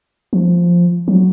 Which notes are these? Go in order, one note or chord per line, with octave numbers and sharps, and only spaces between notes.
F3
F#3